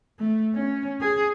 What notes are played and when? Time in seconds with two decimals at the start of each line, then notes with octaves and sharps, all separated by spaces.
0.19 A3
0.55 C#4
1.01 G#4